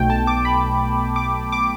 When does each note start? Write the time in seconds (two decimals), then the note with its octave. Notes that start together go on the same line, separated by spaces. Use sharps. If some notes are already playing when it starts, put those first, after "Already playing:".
Already playing: B1 B2 A3 G5
0.10 A5
0.27 D6
0.45 B5
1.16 D6
1.52 D6